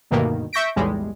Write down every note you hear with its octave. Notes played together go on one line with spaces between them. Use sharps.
D2 G2 B2 D#3 A#3
E5 C#6 G6 A#6 B6 D7
B1 E2 A2 G3 G#3